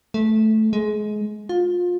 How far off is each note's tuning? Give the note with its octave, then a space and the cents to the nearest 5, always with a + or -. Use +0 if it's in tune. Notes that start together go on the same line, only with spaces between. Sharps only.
A3 -10
G#3 +25
F4 +25